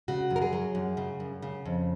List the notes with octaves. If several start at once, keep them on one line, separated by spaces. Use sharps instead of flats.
C#3 F#4
F#2
A#4
G#4
F#3
F#2
C#3
F#2
C#3
F2